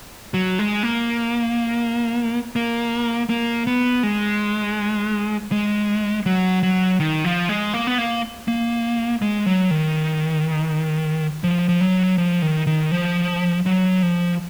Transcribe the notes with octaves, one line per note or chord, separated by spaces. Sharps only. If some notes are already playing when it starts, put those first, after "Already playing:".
F#3
G#3
A#3
A#3
A#3
B3
G#3
G#3
F#3
F#3
D#3
F3
G#3
A#3
B3
A#3
A#3
G#3
F#3
D#3
F3
F3
F#3
F3
D#3
D#3
F3
F#3
F3